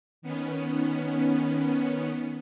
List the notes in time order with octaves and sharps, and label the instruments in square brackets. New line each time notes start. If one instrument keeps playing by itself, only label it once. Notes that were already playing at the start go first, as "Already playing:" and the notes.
[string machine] D#3 B3 C#4